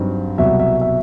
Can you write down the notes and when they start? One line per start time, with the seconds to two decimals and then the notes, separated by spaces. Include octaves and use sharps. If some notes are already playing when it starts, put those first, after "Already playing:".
Already playing: G2 F#3 C4 D#4
0.38 C2 B2 F#3 E5
0.59 E5
0.81 E5